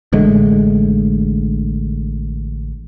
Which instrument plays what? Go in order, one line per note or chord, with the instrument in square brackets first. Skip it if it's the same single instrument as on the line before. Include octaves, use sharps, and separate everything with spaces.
[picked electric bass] A1 D3 G#3 A3